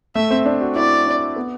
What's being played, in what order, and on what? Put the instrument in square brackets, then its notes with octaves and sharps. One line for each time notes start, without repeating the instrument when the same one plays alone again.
[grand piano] A3 [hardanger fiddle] E5
[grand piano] C4
D4
F#4
[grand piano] E4 [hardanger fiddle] D5
[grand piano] D4
B3